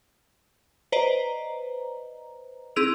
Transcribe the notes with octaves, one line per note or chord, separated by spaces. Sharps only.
B4 C5 D5 D#5 A#5
C4 E4 G#4 E6 D7 F7